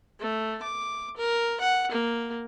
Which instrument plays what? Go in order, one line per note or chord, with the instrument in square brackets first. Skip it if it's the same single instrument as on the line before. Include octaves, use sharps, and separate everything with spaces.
[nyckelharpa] A3
D6
A#4
F#5
A#3